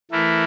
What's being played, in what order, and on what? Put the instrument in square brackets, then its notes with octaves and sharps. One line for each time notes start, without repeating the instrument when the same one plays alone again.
[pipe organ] E3 A3 E4 A#4